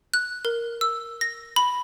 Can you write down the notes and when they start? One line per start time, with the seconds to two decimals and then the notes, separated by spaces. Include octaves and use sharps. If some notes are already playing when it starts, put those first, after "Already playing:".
0.14 F#6
0.45 A#4
0.81 E6
1.21 A#6
1.56 B5